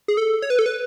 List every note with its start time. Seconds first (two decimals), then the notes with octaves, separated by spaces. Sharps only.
0.08 G#4
0.17 A4
0.42 C#5
0.50 B4
0.59 A4
0.66 B4